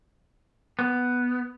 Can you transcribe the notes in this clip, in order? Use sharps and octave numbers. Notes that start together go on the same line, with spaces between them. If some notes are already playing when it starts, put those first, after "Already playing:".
B3